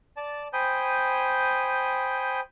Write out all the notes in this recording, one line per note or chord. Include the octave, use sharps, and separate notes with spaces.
D5 A5
C5 G5 G#5 B5 D#6 G6